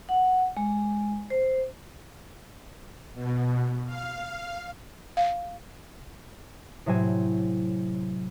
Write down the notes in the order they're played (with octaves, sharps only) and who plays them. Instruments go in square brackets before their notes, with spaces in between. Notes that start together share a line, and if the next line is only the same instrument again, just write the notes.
[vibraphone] F#5
G#3
C5
[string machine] B2
F5
[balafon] F5
[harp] A2 C3 F#3 C5 G#5